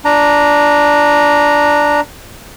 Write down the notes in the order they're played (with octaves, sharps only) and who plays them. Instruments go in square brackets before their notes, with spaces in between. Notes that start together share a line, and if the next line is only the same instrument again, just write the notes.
[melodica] D4 A#5